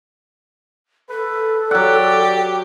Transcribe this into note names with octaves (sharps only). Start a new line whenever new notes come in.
A4 B4
F#3 G4 D5 F#5